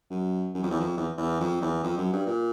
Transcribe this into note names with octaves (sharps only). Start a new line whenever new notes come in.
F#2
F#2
F2
E2
F2
E2
E2
F2
E2
F2
F#2
G2
A#2